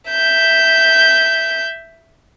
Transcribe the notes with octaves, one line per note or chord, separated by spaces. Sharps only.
E5 G6